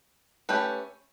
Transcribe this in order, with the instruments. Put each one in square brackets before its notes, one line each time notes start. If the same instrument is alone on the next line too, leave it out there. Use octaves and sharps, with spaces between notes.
[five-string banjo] A3 C#4 G4 B4